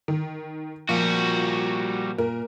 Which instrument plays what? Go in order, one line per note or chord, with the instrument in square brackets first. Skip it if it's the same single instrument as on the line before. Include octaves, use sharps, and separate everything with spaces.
[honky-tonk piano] D#3
[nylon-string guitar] A#2 F3 [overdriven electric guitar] G3 F#4 [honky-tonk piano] F4
[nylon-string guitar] A#2 [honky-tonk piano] A#4